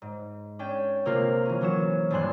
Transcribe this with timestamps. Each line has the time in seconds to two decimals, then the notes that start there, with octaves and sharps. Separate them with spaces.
0.02 G#2
0.59 C#4 D4 G5
1.05 C3 A#3 F4 A#4
1.45 E3 C#4
1.61 E3 F#3 C#4 F#4 C#6 E7
2.10 D#1 G2 D4 G#5 C6 F#6